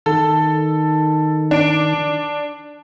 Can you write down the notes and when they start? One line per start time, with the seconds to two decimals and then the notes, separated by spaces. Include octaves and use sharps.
0.06 D#3 A4
1.51 D4 D7